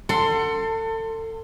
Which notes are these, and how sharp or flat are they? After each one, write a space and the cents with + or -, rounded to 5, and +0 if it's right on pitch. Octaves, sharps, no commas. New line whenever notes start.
A4 +30 F#5 +0 C6 +0